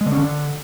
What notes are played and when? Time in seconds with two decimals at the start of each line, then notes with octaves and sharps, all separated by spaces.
0.01 G#3
0.06 D3
0.12 C#4
0.17 D3